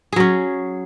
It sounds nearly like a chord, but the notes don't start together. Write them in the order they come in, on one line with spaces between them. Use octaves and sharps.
G#4 F#3 C#4